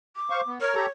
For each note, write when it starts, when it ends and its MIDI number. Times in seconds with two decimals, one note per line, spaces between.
0.16 0.50 86
0.30 0.41 72
0.30 0.41 77
0.30 0.41 85
0.47 0.58 59
0.61 0.74 70
0.61 0.89 73
0.61 0.74 89
0.75 0.86 67
0.75 0.86 69
0.75 0.86 82